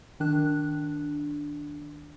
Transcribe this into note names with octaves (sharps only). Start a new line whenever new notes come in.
D#3 D4 F#6